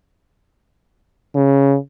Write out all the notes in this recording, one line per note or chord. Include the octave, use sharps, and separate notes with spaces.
C#3